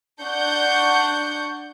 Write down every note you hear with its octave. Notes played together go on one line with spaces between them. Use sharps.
D4 F#5 C#6 G6